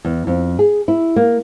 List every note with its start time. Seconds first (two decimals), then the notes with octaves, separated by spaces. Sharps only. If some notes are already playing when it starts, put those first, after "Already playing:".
0.05 E2
0.27 F2
0.59 G#4
0.88 E4
1.16 A#3